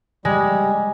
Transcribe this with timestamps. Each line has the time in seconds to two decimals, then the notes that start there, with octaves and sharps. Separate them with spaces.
0.25 G3 G#3